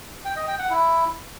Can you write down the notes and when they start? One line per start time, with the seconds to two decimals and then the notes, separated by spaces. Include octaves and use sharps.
0.25 G5
0.36 D#5
0.47 G5
0.59 F#5
0.70 E4